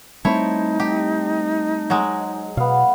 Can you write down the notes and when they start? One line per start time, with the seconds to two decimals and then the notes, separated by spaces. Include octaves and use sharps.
0.25 G3 A3 C4 D#4 E4 C5 C#5 A5
0.80 G4
1.90 F#3 G#3
2.57 B2 B3 F5